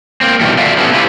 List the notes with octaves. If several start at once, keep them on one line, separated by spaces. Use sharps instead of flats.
A#3 C4
B2 D#3 E3 G3 A3
F4 F#4 A4 D5 E5 F5
B3 C#4 G4 A4
E4 F4 G4 B4